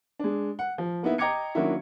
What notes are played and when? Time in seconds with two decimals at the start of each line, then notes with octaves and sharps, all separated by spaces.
0.19 G#3 D4
0.59 F#5
0.78 F3
1.03 A#3 B3 D#4 E4
1.18 D#5 G5 A#5 D6 G#6 C#7
1.55 D#3 F#3 A#3 C#4 D4 E4